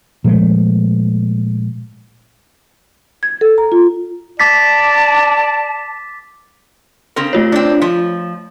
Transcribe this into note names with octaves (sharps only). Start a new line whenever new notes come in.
A#2 F3 G#3 A3
G#6
A4
A#5
F4
D5 A5 D6 A6 B6
C#3 C4 A#4
A3 F4 C#5
C4 D4
F3